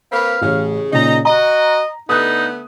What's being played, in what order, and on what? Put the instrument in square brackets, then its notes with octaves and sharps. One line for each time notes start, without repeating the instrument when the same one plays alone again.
[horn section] A#3 C4 B4 [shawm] F5
[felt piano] A1 [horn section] C#3
[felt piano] A#2 C#3 [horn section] D#4 A#5 [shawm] D#5
[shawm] F#4 [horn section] D#5 [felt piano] A#5
[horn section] D3 A3 B3 [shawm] D#4 [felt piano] D#6 F#6